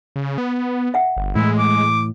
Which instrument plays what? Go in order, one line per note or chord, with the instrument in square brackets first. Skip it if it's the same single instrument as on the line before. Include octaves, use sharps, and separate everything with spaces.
[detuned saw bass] C#3
B3
[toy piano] E5 F#5
[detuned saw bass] G1
[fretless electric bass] A2 E3 [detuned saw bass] G#3 [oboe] E4
[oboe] D6